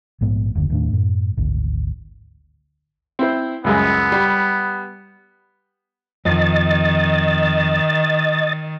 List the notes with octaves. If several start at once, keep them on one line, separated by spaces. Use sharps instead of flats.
A#1 G#2 G#3 B3
F#1 D#2 D3
D#2 A2 D4
F#2 A2
G#1 D2
C4 E4 C5
C#2 F#2 G#3 B3
G3
F2 D#3 D#5 A6